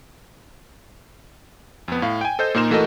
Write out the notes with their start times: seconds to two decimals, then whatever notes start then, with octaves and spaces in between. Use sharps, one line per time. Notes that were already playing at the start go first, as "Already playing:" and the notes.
1.88 F2 B3
2.02 A2 F5
2.21 G5 G#5
2.39 A4 C5 D#5 G6
2.54 A#2 A#3 D#4 A#4 C6 E7
2.70 E3 A3 F#4 A4 A#4 D#5